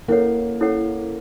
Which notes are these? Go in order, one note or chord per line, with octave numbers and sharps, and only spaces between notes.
A#3 C#4 E4 A4 C#5 F#5
C#4 E4 A4 C#5 F#5